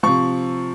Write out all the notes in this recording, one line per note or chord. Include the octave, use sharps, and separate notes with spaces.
C3 F3 C#6